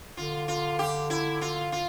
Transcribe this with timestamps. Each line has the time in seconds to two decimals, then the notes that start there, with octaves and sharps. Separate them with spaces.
0.17 D3 F4
0.48 F4
0.79 G4
1.10 E4
1.41 F4
1.72 F4